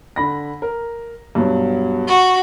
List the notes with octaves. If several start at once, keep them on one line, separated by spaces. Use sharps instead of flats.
D3 B5 A#6
A#4
G2 B2 F#3
F#4